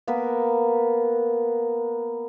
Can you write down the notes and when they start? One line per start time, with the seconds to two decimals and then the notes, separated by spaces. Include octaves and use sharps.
0.07 A#3 B3 A#4 B4